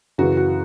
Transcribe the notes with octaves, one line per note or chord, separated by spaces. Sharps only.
F#2 C#3 E3 F#4
F#4